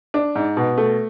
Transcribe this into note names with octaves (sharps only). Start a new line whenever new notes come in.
D4
G#2
B2
A3